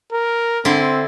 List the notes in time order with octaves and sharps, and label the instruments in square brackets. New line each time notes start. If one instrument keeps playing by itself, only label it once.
[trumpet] A#4
[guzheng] D3 E4 C6 [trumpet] C4